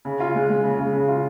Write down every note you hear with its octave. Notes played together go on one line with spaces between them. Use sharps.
C#3
F4
G#3
G#3
C#3
C#3
C#3
F4